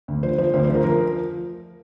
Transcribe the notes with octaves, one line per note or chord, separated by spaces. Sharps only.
D2
F3 C5
F3 C5
D2 C5
C5
F3 A#4
F3 A#4